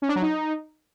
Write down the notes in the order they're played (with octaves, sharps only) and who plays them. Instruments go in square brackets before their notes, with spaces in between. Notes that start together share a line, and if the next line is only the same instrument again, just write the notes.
[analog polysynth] C#4
D4
F#3
D#4